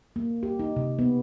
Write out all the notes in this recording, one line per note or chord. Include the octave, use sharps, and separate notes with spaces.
A#3
G4
D#4
C3
B3